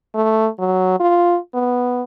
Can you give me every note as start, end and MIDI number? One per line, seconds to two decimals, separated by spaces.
0.14 0.48 57
0.59 0.99 54
1.00 1.38 65
1.54 2.02 59